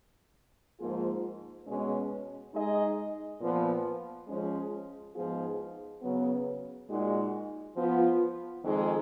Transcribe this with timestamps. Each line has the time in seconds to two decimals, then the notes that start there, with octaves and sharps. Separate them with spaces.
0.79 G#2 F3 A#3 F4 G#4
1.66 B2 G#3 C#4
2.53 G#3 D#4 G#4 D#5
3.40 A#2 F3 B3
4.28 F3 G#3 C#4 G#4
5.15 G#2 F3 B3 F4 G#4
6.02 C#3 F#3 B3
6.89 A#2 G#3 D#4 F#4
7.77 F3 B3 F4
8.64 F2 D#3 G#3